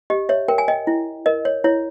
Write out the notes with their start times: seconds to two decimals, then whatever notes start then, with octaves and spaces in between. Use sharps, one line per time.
0.10 G4 D#5
0.29 C#5 E5
0.48 A#4 G5
0.58 G#5
0.68 D#5 G5
0.87 E4
1.26 A#4 D#5
1.45 C#5
1.64 E4 C#5